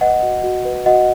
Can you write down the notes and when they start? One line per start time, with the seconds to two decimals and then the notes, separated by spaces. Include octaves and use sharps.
0.01 B4 D#5 F#5
0.22 F#4
0.44 F#4
0.65 B4
0.86 F#4 D#5 F#5